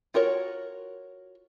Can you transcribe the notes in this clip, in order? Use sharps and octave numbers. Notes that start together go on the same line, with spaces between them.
F4 F#4 A#4 C#5